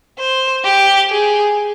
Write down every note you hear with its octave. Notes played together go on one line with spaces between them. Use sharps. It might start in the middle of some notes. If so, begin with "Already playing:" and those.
C5
G4
G#4